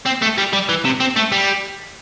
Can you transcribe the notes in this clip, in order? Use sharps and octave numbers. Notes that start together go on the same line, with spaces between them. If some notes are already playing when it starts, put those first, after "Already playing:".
C4
A3
G3
G3
E3
C3
C4
A3
G3